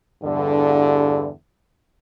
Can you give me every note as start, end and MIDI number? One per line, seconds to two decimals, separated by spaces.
0.23 1.30 40
0.23 1.30 43
0.23 1.30 50